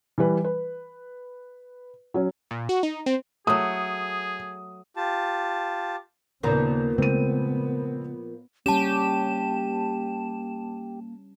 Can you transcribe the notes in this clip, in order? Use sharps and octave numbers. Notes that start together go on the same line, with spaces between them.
E3 G3 B4
B4
F#3 C#4
A#2
F#4
D#4
C4
F#3 A3 G#4 D#6
F4 G4 A5
D#2 A#2 C#3 F3 B3 A#5
C#3 G#3 A3 B3 C4 D#7
G3 A#3 C#4 G4 A5 E7